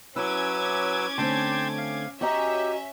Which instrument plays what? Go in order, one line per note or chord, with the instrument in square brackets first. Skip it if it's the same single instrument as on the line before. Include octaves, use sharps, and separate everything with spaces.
[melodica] F#3 B4 E6 [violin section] C#4 D6 G#6 [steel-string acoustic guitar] E4
[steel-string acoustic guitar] D3 A3 C4 [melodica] G5 A5 C6
[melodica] F5
[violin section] C#4 E5 [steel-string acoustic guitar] F#4 D#5 A#5 [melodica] G4